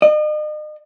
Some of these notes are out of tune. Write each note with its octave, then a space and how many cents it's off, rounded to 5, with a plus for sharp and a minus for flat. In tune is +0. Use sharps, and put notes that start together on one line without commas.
D#5 -40